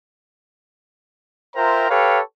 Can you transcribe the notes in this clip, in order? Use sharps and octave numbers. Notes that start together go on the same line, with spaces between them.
F4 A#4 C5 E5 G5 A#5
G4 A4 B4 C#5 F5 G5